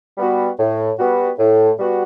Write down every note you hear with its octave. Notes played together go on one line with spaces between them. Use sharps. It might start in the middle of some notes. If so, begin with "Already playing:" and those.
G3 B3 F#4
A2
G3 B3 F#4
A2
G3 B3 F#4